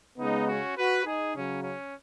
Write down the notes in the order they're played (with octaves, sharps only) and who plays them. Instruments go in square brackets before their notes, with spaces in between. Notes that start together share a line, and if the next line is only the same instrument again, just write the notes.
[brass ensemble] C#3 G#3 B3 D#4
C#4 F#4
F#4 B4
D#4 G#4
C#3 F#3 C#4
C#4